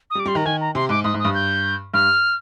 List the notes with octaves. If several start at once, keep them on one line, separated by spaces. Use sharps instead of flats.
D#6
G3
D6
G3 C6
D#3 A#5
D#3 G#5
A#5
C3 C6
G#2 D6
G#2 D#6
G#2
D#6
G2
G6
G2 F6